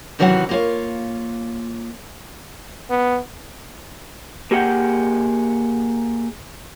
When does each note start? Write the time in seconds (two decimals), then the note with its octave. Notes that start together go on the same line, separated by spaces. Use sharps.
0.19 C3 D#3 E3 F#3 C#4 F#5
0.49 A#3 F4 C#5
2.90 B3
4.51 A#3 G4 G#4 F#5 G5